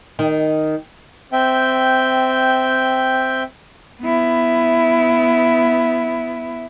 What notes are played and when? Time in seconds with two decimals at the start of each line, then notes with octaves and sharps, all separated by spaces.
0.19 D#3
1.33 C4 E5 G5 G6
4.01 B3 E4